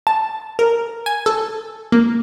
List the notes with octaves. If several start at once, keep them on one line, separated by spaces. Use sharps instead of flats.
A5
A#4
G#5
A4
A#3